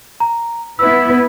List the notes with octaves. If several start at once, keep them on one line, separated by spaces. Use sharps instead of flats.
A#5
B3 E4 B4 E6